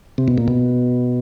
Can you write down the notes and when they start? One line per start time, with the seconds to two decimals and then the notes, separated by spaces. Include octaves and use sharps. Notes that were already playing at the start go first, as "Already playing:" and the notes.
0.18 C3
0.28 B2
0.38 A#2
0.48 B2